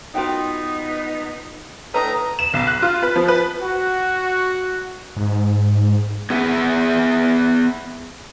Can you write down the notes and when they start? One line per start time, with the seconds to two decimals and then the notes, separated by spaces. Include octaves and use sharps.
0.15 B3 D#4 F4 F#4 G5
1.94 A2 A3 D4 A4 B4 D#5 A#5
2.39 E7
2.54 B1
2.67 F#6
2.82 F4
3.03 B4
3.16 F3
3.28 B4
3.62 F#4
5.17 G#2
6.30 B3 G#4 B4 E5 F#5 G#5